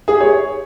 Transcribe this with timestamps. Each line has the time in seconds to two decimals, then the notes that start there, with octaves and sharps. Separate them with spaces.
0.08 G#4
0.14 G4
0.21 C#5